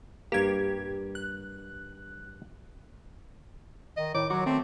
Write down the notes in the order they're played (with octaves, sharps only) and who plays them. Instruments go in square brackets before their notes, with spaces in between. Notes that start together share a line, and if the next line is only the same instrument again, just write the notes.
[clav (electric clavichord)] G2 A#3 [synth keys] G4 G#6
[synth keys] F#6
[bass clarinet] D#3 [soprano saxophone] D#5
[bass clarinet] A2 [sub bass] D#3 [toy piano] E4 C#5 [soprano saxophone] D6
[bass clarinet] F#3 [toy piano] E4 C6 D6 [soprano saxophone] F#4
[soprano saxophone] A3 [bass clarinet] C4